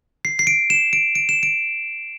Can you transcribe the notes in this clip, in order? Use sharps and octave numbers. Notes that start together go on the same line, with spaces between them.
C7
C7
D7
E7
D7
D7
E7
D7